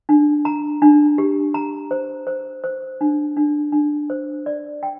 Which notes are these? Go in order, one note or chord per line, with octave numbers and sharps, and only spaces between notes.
D4
A#5
D4
G4
A#5
C5
C5
C5
D4
D4
D4
C5
D5
G5